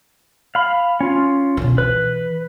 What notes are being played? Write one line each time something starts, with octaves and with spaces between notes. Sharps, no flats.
F5 B5
C#4 F4
B2 D3
E3 B4